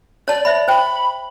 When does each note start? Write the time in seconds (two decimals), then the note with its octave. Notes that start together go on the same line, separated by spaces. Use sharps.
0.28 C#5 D5 A5
0.45 C5 D5 E5 B5
0.68 C5 G5 B5